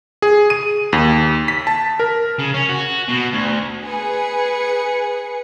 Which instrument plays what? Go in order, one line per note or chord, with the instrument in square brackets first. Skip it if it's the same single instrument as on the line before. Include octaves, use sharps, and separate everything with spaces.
[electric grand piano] G#4
D#7
D#2
B6
A5
A#4
[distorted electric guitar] C#3
C#4
F#4
B2
D2
[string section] G#4 B4 C#7